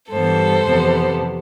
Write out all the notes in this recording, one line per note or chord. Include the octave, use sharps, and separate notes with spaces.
G2 E3 G3 B3 A4 C5
F2 C3 E3 B3